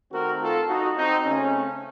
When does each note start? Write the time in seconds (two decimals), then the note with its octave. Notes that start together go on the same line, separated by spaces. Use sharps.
0.12 D#3 A3 C4 F#4 A#4
0.40 F4 A4
0.68 D#4 F#4
0.97 C4 D#4
1.25 C#3 A3 C4 C#4